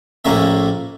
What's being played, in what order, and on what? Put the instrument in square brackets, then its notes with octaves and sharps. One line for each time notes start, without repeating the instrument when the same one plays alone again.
[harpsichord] A#1 A2 A3 A#3 C#4 E5